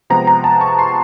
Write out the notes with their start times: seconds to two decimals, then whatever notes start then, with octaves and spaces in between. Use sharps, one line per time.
0.10 C3 F3 G#3 B3 A#5
0.27 A#5
0.44 A5
0.61 C#6
0.79 C6